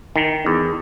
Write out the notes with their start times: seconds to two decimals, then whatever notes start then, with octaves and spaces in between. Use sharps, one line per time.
0.16 D#3
0.46 E2